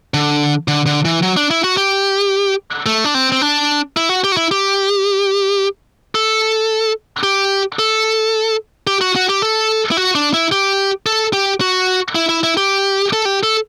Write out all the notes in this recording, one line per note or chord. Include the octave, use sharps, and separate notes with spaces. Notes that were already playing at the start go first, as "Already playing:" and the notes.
D3
D3
D3
E3
F#3
D4
E4
F#4
G4
A3
D4
C4
C4
D4
E4
F#4
G4
F#4
E4
G4
A4
G4
A4
G4
F#4
F#4
G4
A4
E4
F#4
D4
E4
G4
A4
G4
F#4
E4
E4
E4
G4
A4
G4
A4